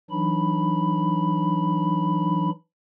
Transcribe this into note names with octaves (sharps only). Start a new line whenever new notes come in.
E3 F#3 D4 D#4 B5